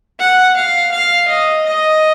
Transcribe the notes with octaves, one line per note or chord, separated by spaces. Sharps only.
F#5
F5
F5
D#5
D#5